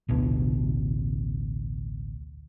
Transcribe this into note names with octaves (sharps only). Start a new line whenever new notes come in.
A1 D2 B2